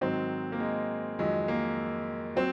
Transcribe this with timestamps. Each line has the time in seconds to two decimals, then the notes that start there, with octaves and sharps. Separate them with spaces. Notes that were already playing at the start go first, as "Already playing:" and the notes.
0.01 G#2 D#3 F#3 C4
0.52 A#3
0.60 G#3
1.19 F2 D#3 F#3 G#3
1.48 A#3
2.36 F#3 C4